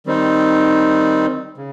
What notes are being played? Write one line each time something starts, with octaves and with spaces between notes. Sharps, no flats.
D#3 G3 C4 D#4
C#3